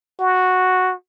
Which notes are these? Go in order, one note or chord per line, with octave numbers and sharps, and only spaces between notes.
F#4